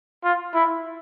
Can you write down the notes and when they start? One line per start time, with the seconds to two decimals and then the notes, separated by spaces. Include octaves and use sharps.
0.24 F4
0.54 E4